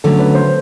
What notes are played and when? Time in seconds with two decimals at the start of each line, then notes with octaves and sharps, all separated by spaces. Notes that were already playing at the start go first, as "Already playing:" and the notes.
0.04 D3 F#3 A3 C#4 A4
0.19 B4
0.34 C5